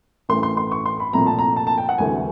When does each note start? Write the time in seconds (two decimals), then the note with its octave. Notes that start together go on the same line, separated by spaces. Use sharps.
0.29 A1 A2 E3 A3 C6
0.43 C6
0.57 C6
0.72 C#6
0.85 C6
1.00 B5
1.13 C2 A#2 F3 A3 C4 A#5
1.26 A5
1.39 A#5
1.56 A5
1.67 A5
1.78 G5
1.89 F#5
1.98 E1 D2 C3 E3 A3 G#5